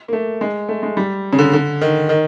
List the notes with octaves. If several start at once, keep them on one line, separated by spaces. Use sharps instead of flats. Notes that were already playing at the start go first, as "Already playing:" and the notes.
A#3
A3
G#3
A3
G#3
G3
C#3
D3
D3
D#3
D#3